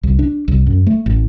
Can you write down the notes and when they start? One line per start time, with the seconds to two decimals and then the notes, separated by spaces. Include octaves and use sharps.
0.03 C2
0.19 D4
0.48 C2
0.66 F#2
0.87 A3
1.06 A1